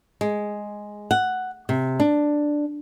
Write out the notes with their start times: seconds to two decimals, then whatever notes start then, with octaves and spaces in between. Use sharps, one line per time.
0.21 G#3
1.11 F#5
1.69 C3
2.00 D4